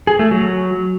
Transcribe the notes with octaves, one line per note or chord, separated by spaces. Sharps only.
G#4
A3
F#3